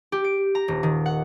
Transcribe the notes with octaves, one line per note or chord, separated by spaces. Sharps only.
G4
D7
A#5
D#1
D#3
F#5